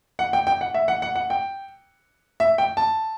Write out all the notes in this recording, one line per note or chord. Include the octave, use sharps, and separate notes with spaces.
F#5
G5
G5
F#5
E5
F#5
F#5
F#5
G5
E5
G5
A5